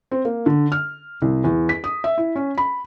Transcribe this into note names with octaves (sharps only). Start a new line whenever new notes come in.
C4
A#3
D3
F6
C2
E2
B6
D#6
E5
E4
C#4
B5